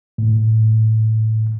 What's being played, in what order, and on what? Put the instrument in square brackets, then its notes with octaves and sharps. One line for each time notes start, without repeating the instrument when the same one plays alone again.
[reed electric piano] A2